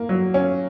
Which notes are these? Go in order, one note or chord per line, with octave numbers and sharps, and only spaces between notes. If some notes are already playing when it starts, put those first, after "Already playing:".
Already playing: A#3
F#3
C#4